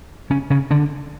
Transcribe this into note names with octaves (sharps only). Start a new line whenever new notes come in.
C#3 C#4
C#3 C#4
D3 D4